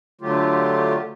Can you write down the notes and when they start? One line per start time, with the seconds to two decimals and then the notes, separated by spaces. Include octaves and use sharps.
0.21 D3 F#3 A3 F4 G4